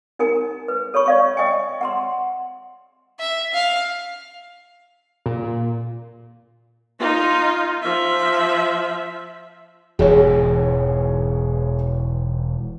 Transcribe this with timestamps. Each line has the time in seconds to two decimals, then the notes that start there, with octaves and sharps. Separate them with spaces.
0.19 D#4 A#4 G#5 A#5
0.68 B4
0.94 A4 C#5 B5 C#6
1.06 D5 F5 C#6
1.37 D#5 G5 G#5
1.81 F#5 A#5 C6
3.19 E5
3.53 F5
5.26 A#2
6.99 D#4 F4
7.82 F3 E5
9.99 E1 G#2 E3 G#4 C#5